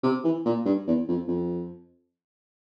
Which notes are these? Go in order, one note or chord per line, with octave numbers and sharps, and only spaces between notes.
C3
E3
A#2
G2
E2
F2
F2